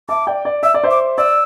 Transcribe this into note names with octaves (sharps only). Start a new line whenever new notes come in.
E5 A5 D6
D5 G5
D5
E5 E6
D5
C5 E5
D6
D5 E6